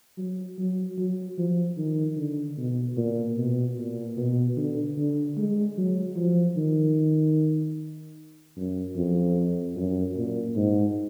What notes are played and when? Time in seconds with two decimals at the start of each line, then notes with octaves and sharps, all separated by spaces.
0.18 F#3
0.58 F#3
0.98 F#3
1.38 F3
1.77 D#3
2.17 D3
2.58 B2
2.97 A#2
3.37 B2
3.78 A#2
4.17 B2
4.57 D3
4.98 D3
5.37 G#3
5.77 F#3
6.16 F3
6.57 D#3
8.56 F#2
8.96 F2
9.76 F#2
10.16 A#2
10.56 G#2